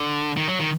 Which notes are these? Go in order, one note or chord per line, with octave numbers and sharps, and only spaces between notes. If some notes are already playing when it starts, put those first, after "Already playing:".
Already playing: D3
D#3
F#3
D#3